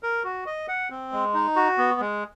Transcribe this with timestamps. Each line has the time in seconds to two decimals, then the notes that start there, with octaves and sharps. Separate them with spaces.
0.03 A#4
0.24 F#4
0.46 D#5
0.68 F#5
0.90 C4
1.12 G#3
1.34 D#4
1.56 F#4
1.78 B3
2.00 G#3